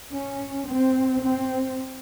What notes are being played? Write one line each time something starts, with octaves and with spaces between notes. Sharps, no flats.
C#4
C4
C4